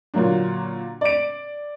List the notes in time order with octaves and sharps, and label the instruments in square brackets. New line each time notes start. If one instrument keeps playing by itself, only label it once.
[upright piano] A#2 D3 F#3 A#3 D4
D5 D7